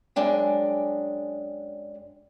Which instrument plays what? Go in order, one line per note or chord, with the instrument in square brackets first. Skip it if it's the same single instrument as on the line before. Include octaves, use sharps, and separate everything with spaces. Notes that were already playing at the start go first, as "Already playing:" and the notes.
[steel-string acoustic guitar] F#2 G#3 D4 G5